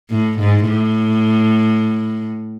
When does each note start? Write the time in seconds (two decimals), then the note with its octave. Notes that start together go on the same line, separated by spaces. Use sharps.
0.10 A2
0.39 G#2
0.68 A2